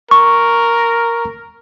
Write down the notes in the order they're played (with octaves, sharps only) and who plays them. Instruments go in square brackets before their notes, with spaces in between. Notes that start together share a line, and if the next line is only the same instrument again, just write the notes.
[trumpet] A#4 [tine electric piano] C#6